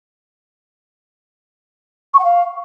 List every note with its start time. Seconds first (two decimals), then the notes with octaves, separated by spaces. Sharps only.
2.14 C#6
2.19 F#5
2.24 F5